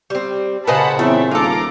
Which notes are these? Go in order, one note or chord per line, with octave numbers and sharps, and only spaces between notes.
G3 C4
A#2 C#3 B4 C5 D#5 F#5 A5 B5
E2 G3 A3 C4 C#5 E5
D#1 F4 A4 F5 A#5 D6